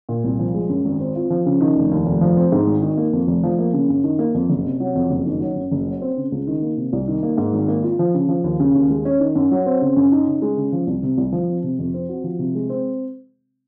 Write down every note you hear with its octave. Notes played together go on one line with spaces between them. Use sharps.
A#2
C2
F3
G#3
F#2
G#1
C4
F4
F3
C#3
D#3
F1
D#2
F1
F3
C4
G#2
G#1
D#3
A#3
F2
F1
F3
A#3
C#3
F#2
D#3
A#3
F2
F#1
C3
F#3
F2
F#1
D#3
F#3
F#2
F#1
F#3
C4
C#3
C#2
D#3
A#3
C3
C2
D#3
A#3
G#2
G#1
A#3
F4
F3
C#3
F3
D#2
C#3
D#2
G#3
C#4
D#3
F#2
F#3
C4
C#3
F#2
D#4
C#3
G#3
C#3
F3
C2
C3
C2
F3
C4
C3
F2
C4
F#4
F3
C3
G#3
C4